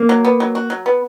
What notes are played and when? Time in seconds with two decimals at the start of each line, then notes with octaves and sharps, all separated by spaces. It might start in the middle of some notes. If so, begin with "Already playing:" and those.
Already playing: A#3
0.09 F#3
0.25 B3
0.40 F#3
0.55 F#4
0.70 F#3
0.86 B3